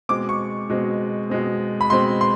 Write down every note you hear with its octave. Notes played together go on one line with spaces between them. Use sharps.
B2 G#3 C4 D6
C#6
B2 G#3 C4
B2 G#3 C4
B5
B2 G#3 C4 C6
C6